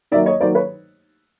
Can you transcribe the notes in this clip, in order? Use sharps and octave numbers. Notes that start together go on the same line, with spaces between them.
D#3 F#3 A#3 D5 E5
C#5 D#5
D#3 F#3 A#3 C5 D5
B4 C#5